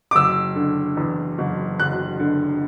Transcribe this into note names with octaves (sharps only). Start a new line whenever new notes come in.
D6
F#1 E6
D3
E2
F#1
F#1 F#6
D3